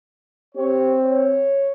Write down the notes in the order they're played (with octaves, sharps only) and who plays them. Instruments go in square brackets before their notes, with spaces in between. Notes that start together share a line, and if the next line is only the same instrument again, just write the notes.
[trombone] C4 [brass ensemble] G4 C#5
[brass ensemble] C#5